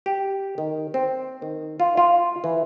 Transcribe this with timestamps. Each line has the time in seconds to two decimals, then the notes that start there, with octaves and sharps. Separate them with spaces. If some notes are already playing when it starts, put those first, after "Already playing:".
0.06 G4
0.58 D#3
0.94 C4
1.42 D#3
1.80 F4
1.97 F4
2.44 E3